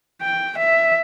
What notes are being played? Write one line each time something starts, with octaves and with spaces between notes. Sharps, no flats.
G5
E5